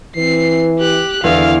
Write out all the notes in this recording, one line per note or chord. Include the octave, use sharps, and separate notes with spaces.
E3 C4 C7
G4 F#6
E2 D3 F5